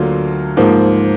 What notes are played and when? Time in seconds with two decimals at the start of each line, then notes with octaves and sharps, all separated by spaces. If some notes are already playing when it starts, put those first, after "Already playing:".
Already playing: D2 D3 F#3 A#3 F4
0.57 G#2 F3 A#3